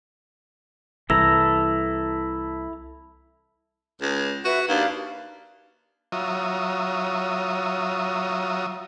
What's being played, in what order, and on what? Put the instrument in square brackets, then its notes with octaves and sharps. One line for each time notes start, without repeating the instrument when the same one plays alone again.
[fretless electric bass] C2 E3 [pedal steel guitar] E4 A4 A#5 [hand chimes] E6
[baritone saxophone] C#2
[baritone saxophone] F#4 [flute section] B4 E5
[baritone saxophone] D#2 [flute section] D4 B4 F5
[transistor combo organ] F#3 F4 C#5 E5 A#5 D#6